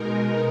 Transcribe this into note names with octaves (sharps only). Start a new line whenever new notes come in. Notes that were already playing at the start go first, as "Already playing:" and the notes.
Already playing: B2 G#3 D#4 A#4